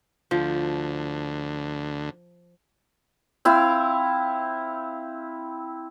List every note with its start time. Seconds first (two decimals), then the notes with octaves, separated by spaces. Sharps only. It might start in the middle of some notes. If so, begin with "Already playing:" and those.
0.31 D2 F3
3.45 C4 E4 F5